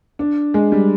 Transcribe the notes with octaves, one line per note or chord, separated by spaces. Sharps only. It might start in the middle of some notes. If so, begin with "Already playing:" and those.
D4
G#3
G3